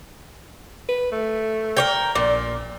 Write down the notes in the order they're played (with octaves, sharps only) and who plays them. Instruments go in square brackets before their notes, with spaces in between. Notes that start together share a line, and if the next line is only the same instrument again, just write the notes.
[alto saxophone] B4
A3
[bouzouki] A#4 C#5 G5
[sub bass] A#1 [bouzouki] A#2 [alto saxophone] D5